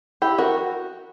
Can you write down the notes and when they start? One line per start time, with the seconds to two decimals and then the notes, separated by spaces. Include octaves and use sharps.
0.22 E4 G4
0.38 F#4 A#4